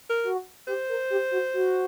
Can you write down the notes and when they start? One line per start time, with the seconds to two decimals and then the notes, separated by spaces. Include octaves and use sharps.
0.10 A#4
0.24 F#4
0.67 G4 C5
0.89 A#4
1.10 G4
1.31 F#4
1.54 F#4